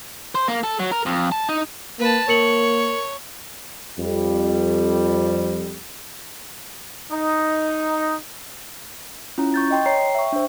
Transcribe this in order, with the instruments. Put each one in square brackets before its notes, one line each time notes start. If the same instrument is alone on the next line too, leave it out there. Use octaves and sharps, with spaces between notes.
[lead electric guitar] C5
A#3
A4
F#3
A#4
F2
A5
D#4
[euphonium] A#3 [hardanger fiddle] B4 A5
[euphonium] A#3 [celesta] A#4 C#7 F#7 [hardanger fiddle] C#5
[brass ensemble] F2 G3
[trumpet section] D#4
[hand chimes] C#4 E4 F4 A#5
C#6 G6 A6
D#5 G5 C6
C#5 G5 A#5 C7
E5 G5 C#6
D4 C5